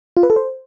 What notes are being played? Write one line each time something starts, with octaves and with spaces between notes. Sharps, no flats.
F4
B4
A4
C5